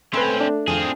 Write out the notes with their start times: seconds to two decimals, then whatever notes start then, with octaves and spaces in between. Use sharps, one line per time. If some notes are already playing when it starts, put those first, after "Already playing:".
0.13 A3 C4 C#4 B4 B5 C6
0.41 D4
0.68 F2 C4 D4 F4 G#4